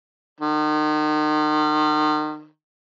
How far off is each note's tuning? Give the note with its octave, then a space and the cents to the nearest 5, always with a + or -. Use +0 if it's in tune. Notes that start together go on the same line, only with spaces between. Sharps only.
D#3 -35